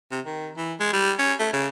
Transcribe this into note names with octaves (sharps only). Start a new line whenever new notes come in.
C3
D#3
E3
G#3
G3
C#4
A3
C#3